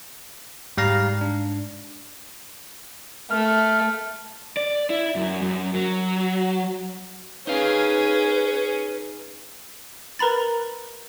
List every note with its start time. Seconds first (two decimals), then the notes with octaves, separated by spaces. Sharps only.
0.77 G#2 G3 F5 A#5
1.21 D4
3.30 A3 F6
4.57 D5
4.90 E4
5.16 F#2
5.42 F#2
5.75 F#3
7.47 C#4 D#4 G#4 B4 F5
10.19 A#4 B4 A#5 B5 A6